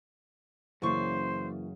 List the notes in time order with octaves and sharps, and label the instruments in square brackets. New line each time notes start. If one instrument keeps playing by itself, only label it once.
[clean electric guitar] F#2 C#3 [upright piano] E3 A#3 [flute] C5 [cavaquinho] D5 C#6